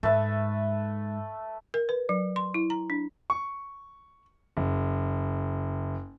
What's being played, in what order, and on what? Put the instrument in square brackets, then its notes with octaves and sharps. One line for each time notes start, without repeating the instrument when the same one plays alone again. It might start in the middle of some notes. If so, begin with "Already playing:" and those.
[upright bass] G#2 [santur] A3 B4 E5
[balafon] A#4
B4
F#3
C6
E4
A#5
D4
[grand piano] C#6
F#1